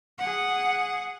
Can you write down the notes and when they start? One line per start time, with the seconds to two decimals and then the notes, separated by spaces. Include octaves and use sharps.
0.18 G#4 F#5